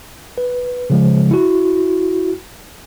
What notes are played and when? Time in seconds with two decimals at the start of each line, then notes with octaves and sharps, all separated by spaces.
0.38 B4
0.90 C#3 F3 G#3
1.31 E4 F#4